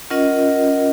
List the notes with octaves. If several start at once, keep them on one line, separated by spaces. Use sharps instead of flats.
C#4 F4 A#4 D#5 F#5